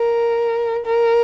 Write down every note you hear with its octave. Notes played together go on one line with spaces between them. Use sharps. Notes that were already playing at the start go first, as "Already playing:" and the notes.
Already playing: A#4
A#4